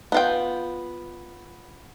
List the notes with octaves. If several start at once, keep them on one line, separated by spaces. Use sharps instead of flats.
B3 F4 G5